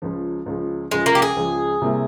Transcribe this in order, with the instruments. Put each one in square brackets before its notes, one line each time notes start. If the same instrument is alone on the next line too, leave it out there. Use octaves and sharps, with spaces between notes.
[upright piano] C#2 C#3 F3
C#2 C#3 F3
[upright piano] C#2 C#3 F3 [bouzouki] G#3
[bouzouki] A#3
G4
G#4
[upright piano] C#2 C#3 F3
C3 G3 A#3 E4